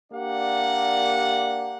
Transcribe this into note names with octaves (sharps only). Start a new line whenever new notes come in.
A#3 D4 G4 D5 F#5